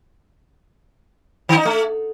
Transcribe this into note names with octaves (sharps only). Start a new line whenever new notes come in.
D#3
D#4
A3